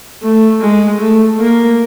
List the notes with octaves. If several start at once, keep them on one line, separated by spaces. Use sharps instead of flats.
A3
G#3
A3
A#3